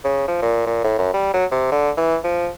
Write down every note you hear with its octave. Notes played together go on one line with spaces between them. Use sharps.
C#3
F3
A#2
A#2
A2
F#2
G3
F#3
C3
D3
E3
F3